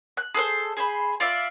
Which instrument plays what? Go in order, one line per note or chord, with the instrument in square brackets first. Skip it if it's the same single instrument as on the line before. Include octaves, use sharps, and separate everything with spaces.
[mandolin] F#6
G#4 A4 B4 C5
G#4 C5 B5
F4 D5 E5